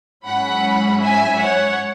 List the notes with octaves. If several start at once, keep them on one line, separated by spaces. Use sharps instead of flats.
G#2 F#3 C#4 E4 F#5 B5
E5 G#5
C#5 F#5